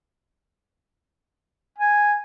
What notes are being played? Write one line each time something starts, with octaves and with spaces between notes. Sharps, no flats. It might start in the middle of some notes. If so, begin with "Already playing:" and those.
G#5